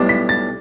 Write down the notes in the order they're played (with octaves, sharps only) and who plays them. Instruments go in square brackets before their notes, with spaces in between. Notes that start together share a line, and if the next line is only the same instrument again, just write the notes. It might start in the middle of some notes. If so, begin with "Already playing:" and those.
Already playing: [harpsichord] B1 A2 G3 D4
[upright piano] B6
A6